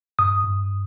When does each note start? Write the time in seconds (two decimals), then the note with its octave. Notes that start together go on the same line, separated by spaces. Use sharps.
0.19 G2 D#6
0.44 G2